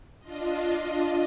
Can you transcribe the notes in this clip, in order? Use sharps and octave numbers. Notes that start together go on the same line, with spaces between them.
D4 F4 D#5